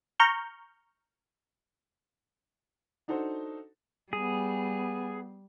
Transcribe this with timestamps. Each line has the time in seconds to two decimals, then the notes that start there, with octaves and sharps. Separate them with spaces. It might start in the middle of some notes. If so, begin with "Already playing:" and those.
0.20 A#5 C#6 F6 G6
3.08 D4 D#4 F#4 A4 C5
4.13 G3 B3 G#4